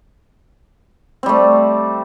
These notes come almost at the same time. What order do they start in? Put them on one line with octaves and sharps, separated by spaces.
C4 G3 A3